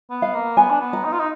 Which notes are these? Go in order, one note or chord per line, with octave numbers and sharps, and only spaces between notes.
B3
F5
A#3
B3 G#5
D4
B3
A#5
D#4
F4
D#4